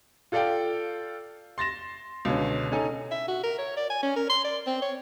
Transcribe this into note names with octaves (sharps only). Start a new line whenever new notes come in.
F4 A4 D5 F5 G5
C6 A6 A#6 E7
C#2 B2 D3 C#4
C#4 D#4 A4 G#5
E5
F#4
A#4
C#5
D5
G#5
C#4
A#4
C6
D5
C4
C#5